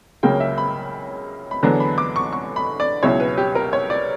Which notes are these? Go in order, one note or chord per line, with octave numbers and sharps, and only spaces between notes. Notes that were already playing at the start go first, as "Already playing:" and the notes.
C#2 C#3 F#3 A#3 G5
E5
B5
B5
E2 D3 F#3 B3 D4 A#5
B5
D6
C#6
C#6
B5
D5
C#2 B2 F#3 C#4 E4 C#5
B4
G4
A#4
C#5
D5